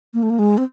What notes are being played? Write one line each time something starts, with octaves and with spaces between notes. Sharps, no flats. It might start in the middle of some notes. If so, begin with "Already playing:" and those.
A#3
A3
A#3
G#3
C4